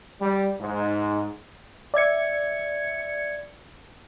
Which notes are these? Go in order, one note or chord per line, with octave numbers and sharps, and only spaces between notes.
G3
G#2
D5 E5 G#6 C#7